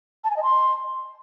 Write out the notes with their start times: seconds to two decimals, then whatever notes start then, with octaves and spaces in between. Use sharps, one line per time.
0.24 A5
0.30 G#5
0.37 D#5
0.43 C6